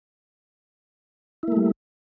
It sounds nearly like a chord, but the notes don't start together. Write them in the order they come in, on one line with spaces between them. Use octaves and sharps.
E4 A#3 A3 G3